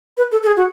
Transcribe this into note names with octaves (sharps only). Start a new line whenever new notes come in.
B4
A4
A4
G#4
F#4